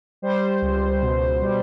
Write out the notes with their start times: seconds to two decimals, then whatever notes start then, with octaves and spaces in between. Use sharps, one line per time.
0.22 G3 C5
0.62 C#2
1.02 B2
1.41 G3